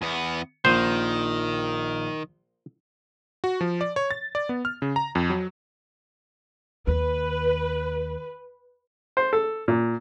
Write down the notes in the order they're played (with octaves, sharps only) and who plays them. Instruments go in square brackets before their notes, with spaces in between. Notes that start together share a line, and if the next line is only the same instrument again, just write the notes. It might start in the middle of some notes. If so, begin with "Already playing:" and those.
[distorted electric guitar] E2 B3
[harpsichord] A#1 [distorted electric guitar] D#3 [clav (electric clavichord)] C5
[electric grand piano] F#4
F3
D5
C#5
A6
D5
B3
F6
C#3
A#5
F2
F#3
[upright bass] D#2 [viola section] B4
[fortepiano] C5
A4
A#2